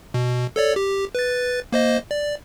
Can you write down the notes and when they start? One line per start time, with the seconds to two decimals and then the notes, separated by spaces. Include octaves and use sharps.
0.14 B2
0.56 A4 C#5 D5
0.76 G4
1.15 B4 A6
1.72 A#3 C5 D#5
2.11 D5